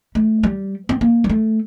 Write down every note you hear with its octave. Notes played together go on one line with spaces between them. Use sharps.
A3
G3
C4
A#3
G3
A3